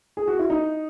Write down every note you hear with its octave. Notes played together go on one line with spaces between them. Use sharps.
G#4
F#4
E4
D#4